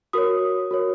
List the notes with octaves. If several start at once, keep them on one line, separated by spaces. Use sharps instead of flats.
F#4 A#4 C#5 D#6
F#4 A#4 C#5